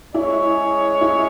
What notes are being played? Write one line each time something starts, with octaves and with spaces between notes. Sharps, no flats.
G#3 C#4 E4 G#4 C#5
E4